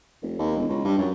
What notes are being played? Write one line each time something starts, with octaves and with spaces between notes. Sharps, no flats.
F1
D#2
E1
C#2
G2
F#2